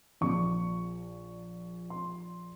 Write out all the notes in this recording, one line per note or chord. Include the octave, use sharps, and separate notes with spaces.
A#1 A#2 C#6
C6